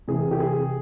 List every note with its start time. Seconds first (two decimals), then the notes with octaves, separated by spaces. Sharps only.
0.08 C3 E3 G#4
0.31 G4
0.40 G#4